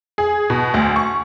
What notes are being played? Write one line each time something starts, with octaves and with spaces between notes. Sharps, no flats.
G#4
B2
D2
C#6